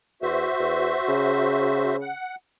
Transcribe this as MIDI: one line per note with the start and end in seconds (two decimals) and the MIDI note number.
0.22 0.47 40
0.22 1.96 66
0.22 1.96 72
0.22 1.96 76
0.59 0.94 40
1.08 2.10 49
2.01 2.35 78